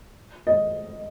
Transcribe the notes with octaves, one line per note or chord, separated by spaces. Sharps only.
D#5